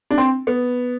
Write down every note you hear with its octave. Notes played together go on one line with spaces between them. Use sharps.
D4
C4
B3